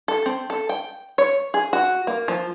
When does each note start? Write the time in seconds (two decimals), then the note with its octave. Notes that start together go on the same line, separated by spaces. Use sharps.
0.08 A4
0.26 C4
0.50 A4
0.69 G5
1.18 C#5
1.54 G#4
1.73 F#4
2.07 A#3
2.28 F3